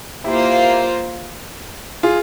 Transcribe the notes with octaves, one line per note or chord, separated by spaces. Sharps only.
A#3 E4 F4 G4 C5
F4 G#4